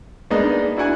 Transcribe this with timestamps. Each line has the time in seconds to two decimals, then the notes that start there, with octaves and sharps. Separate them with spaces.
0.30 G#3 A#3 B3 D4 D#4
0.77 D4 E4 F#4 F#5 G#5